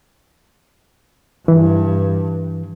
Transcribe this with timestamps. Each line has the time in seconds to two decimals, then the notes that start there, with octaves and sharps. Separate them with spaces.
1.48 G2 E3